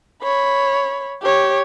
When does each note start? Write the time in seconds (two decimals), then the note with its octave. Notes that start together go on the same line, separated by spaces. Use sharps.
0.23 C#5 B5
1.22 G4 C#5